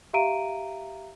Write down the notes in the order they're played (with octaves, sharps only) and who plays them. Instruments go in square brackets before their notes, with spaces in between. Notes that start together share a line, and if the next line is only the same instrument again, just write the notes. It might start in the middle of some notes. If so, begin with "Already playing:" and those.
[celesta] G4 E5 F5 A#5 D7 D#7